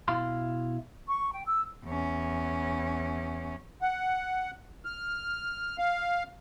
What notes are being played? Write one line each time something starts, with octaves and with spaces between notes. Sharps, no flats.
B2 E4 F5 C6
C#6
G5
E6
E2 C#4
F#5
F6
F5